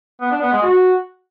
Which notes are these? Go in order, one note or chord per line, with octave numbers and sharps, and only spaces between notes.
B3
D4
B3
G#3
F#4